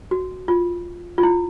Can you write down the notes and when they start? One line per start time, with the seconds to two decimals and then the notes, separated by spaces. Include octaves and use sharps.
0.11 F#4
0.48 F4
1.18 F4
1.23 E4